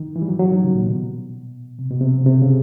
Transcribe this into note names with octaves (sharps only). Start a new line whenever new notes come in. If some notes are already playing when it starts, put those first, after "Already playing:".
Already playing: D#3
E3
G3
F#3
F#3
D#3
C#3
A#2
B2
C3
B2
C3
C#3
C3
C#3